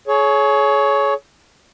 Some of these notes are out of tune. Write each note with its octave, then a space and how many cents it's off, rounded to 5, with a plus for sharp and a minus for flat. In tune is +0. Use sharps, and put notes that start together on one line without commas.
G#4 +35 C#5 +10